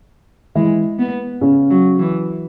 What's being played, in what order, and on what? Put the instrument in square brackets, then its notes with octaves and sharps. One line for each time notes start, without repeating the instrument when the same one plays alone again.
[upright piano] E3 E4 [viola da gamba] G#3
[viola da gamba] B3
[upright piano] C#3 C#4
[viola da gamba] F#3
E3